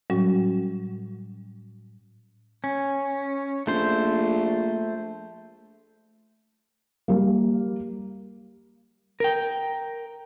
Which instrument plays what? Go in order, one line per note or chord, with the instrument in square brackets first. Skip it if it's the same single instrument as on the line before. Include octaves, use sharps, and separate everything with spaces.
[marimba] A2 F#3 G3 C#4 F#4
[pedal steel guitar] C#4
[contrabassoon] A#1 [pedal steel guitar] A3 C5
[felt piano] G3 A#3
[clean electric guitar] A#4 G5